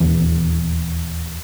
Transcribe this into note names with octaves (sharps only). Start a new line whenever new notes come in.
D#1 E2